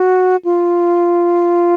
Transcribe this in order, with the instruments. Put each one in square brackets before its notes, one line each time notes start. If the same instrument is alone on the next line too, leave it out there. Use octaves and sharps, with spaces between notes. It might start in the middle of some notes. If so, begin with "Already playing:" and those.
Already playing: [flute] F#4
F4